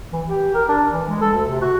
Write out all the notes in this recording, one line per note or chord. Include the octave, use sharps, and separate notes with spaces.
E3
G4
A#4
D4
E3
G#3
A4
D2
C3
F#4